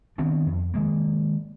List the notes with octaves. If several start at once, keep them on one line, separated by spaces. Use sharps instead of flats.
D#3 B3 C4 D4
F2
D#3 G#3 A#3